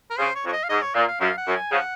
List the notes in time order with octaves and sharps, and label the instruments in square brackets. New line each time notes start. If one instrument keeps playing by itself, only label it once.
[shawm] A#4
[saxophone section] C#3 [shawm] C5
[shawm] C#5
[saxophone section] F2
[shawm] C#5
D#5
F5
[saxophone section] G#2 [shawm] D#5
[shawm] C#5
[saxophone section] A#2 [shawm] F5
[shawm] F5
[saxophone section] F#2 [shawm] F5
[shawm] F#5
[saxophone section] F#2
[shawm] G#5
[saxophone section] C#3 F3 [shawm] F#5